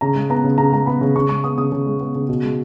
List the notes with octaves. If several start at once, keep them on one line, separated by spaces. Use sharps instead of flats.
C#3 A#5
G#3
B3 A#5
C#3
C#3 A#5
G#3 A#5
B3 B5
C#3
C#3 C#6
G#3 C#6
B3 D#6
C#3 D#6
C#3
G#3
B3
C#3
B2
G#3